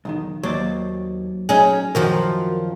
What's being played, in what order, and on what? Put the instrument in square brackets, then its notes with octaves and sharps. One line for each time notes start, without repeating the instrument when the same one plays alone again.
[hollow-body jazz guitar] B1 E2 D#3
[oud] D#2 [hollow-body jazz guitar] F#3 C5 D5
[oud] C#4 D#4 G#4
[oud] F#2 D#3 F3 [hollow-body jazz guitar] F#4 A#4